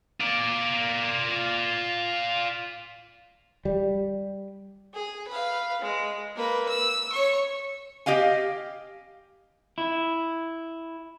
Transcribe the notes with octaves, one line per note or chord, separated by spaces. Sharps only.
F4 D5
G3
G#4
B4 F5
G#3
A#3 B4
E6
C#5 C#6
G4 D#5 F5 G#5
E4